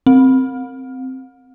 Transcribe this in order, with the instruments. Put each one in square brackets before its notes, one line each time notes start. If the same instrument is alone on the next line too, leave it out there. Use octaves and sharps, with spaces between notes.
[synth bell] C4